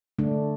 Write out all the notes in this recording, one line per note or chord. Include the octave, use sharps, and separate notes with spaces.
D3 A3 D4